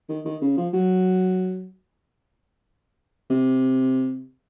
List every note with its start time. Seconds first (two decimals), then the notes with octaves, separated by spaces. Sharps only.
0.09 D#3
0.25 D#3
0.42 C#3
0.57 F3
0.73 F#3
3.30 C3